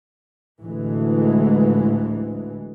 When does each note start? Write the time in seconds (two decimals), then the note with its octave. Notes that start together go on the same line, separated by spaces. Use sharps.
0.61 A1 D2 E3 G#3